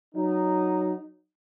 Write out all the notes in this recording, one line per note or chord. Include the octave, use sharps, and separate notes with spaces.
F#3 D#4